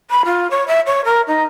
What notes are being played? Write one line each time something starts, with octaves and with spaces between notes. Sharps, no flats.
B5
F4
C#5
E5
C#5
A#4
D#4